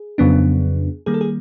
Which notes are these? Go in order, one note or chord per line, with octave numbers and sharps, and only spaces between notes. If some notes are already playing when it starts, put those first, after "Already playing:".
Already playing: G#4
F2 C#3 F#3 B3 D4
D#3 G3 A#3 G#4
A4
G#4